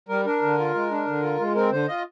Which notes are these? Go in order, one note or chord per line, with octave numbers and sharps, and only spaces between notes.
G3 A#4
D4 A#4
D3
F4
G#3
D4
D3
F4
G#3
C4 A#4
D3 C5
F4 D#5